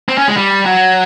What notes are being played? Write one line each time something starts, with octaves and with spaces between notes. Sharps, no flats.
C4
C#4
G#3
G3
F#3